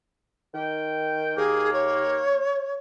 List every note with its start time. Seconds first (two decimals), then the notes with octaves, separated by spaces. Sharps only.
0.54 D#3 G5
1.37 D#2 A#3 G#4
1.73 C#5